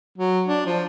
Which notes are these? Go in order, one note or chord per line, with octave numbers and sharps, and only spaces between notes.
F#3
D4
F3